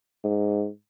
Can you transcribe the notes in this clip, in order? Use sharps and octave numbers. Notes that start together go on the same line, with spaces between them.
G#2